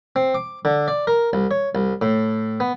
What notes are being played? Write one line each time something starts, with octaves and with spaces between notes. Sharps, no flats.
C4
D6
D3
D5
A#4
C2
C#5
C2
A2
B3